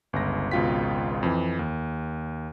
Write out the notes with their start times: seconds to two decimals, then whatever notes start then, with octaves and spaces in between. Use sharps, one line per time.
0.13 G1 C#2 A#6
0.51 G#1 C#2 B2 F4 G5 B6
1.23 F2 E3
1.59 D#2